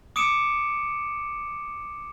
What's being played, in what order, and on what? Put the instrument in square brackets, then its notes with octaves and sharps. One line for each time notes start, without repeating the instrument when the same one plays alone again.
[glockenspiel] D6 D#6 C#7 D7 E7